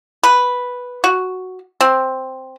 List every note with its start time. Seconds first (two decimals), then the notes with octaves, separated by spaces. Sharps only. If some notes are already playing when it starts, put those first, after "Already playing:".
0.23 B4
1.04 F#4
1.81 C4